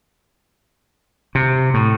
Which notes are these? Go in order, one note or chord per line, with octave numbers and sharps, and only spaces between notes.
C3
A2